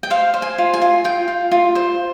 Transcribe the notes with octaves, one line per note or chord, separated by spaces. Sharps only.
G5
C5 F5
C5
G#5
F4
G#5
F4
F4 G5
F4
F4
C5